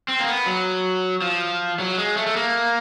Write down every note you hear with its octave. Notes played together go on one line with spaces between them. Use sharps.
C4
A#3
B3
F#3
F3
F#3
G#3
A3
A3
A#3